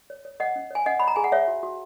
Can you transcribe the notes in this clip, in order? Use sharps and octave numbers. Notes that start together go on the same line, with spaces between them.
C#5
C#5
C#5 D#5 F#5
C#4
C#5 G#5
C#4 D#5 F#5
C#5 B5
A#5
G#4 G#5
F#5
C#5 E5
F#4
F#4